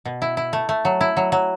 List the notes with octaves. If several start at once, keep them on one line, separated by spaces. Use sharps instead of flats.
B2
E4
E4
A3
A3
F#3
E4
F#3
F#3